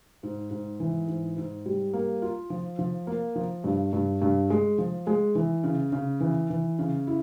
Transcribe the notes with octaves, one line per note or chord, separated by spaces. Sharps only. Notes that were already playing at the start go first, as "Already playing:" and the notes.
G#2
G#2
E3
G#2
G#2
G3
A#3
F4
F3
F3
A#3
F3
G2
G2
G2
G#3
F3
G#3
E3
C#3
C#3
E3
E3
C#3
E4